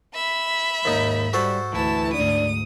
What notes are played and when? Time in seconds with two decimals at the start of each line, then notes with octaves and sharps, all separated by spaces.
0.15 E5 B5
0.85 D#2 G#2 D#4
1.33 G3 F#4 A4 C5
1.73 D2 E3 E4 A5
2.14 D2 G#2 D4 D#6